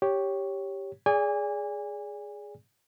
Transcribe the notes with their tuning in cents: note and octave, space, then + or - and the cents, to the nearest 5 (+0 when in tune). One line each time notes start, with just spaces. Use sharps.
G4 +0 C#5 +0
G#4 +0 D5 -25 G#5 -30